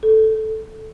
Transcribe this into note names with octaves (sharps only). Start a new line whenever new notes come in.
A4